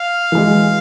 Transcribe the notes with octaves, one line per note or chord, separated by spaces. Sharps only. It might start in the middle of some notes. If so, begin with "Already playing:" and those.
Already playing: F5
E3 G#3